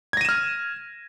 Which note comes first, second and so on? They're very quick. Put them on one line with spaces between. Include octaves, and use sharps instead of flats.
G#6 A#6 D#7 E7 F6